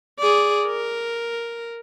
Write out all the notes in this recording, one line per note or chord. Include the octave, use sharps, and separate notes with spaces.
G#4 D5
A#4